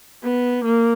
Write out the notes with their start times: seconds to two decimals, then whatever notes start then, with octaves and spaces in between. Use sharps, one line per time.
0.24 B3
0.65 A#3